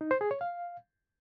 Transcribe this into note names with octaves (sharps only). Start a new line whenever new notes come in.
D#4
C5
G#4
C#5
F5